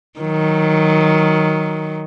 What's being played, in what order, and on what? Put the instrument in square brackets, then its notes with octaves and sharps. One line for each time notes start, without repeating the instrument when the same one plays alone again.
[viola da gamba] D#3 F#3